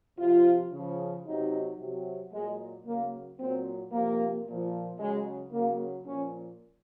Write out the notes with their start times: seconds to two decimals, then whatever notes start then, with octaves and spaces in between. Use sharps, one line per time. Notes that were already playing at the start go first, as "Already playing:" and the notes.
0.18 C3 F3 F4
0.72 C#3 F3
1.25 C3 F#3 D#4
1.79 C3 F#3
2.32 A#2 F#3 G#3
2.85 C#3 F#3 A#3
3.39 A#2 F#3 C4
3.92 C3 F3 A#3
4.46 A#2 F3
4.99 C#3 F#3 G#3
5.52 C#3 F#3 A#3
6.05 A#2 F3 C#4